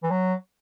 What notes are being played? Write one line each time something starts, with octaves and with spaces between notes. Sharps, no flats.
E3
F#3